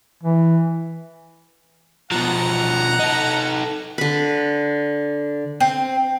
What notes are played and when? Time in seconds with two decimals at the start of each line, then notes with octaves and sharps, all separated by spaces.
0.23 E3
2.12 B2 F3 F#5 A#5
2.99 D#4 A4
3.98 D3 B4
5.60 C4